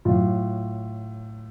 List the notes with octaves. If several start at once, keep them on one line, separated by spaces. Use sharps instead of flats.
A2 F#3 F4